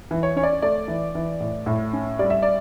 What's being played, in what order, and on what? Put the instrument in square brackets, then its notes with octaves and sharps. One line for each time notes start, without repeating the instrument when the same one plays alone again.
[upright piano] E3
C#5
C#4 C#5
D5
A3 D5
E3
E3
A2
A2
C#4
G3 D5
E5
D5